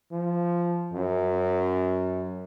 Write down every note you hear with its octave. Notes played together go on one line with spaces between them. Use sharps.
F3
F#2